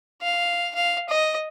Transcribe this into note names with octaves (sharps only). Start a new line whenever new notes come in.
F5
F5
D#5